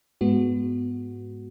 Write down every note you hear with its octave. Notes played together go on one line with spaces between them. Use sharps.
G#2 G#3 B3 F#4